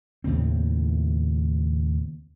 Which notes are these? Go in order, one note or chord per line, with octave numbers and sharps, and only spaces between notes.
D#2 A2 C#3 C4